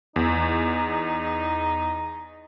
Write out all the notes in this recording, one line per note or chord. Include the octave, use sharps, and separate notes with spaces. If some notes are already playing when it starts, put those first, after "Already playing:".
E2 D#4